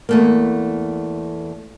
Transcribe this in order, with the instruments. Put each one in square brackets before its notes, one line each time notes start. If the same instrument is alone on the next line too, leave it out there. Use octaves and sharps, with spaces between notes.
[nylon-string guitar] E2 A3 A#3